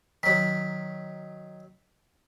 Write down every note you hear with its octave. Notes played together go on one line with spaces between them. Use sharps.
D#3 F#3 B6